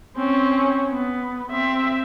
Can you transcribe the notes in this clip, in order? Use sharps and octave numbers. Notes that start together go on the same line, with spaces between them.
C4 C#4
B3
C4 E5